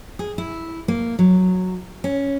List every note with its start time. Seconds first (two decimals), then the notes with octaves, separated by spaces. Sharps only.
0.19 G#4
0.38 E4
0.88 A#3
1.19 F#3
2.04 C#4